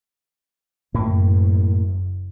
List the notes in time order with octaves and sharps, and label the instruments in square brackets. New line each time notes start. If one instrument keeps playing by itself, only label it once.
[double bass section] F#1 F#2 [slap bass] A2 A#3